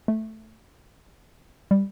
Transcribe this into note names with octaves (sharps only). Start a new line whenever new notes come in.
A3
G3